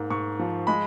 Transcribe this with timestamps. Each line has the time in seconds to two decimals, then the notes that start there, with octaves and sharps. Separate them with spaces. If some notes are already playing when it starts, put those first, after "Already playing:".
Already playing: G#2 A#3
0.10 G#2 C#6
0.39 F3
0.67 G#3 B5